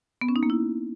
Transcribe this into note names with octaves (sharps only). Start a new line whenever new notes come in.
B3
C#4
D#4
A#3
E4